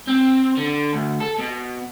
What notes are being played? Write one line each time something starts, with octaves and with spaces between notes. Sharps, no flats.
C4
D3
D2
A4
B2